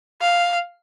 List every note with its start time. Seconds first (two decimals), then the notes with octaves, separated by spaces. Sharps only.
0.21 F5